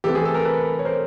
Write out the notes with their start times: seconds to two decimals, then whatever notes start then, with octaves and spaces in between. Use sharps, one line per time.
0.04 E3 A3 C4 G4 A4
0.15 G#4
0.25 A4
0.34 A#4
0.44 A4 B4
0.79 C#5
0.85 A#4 C5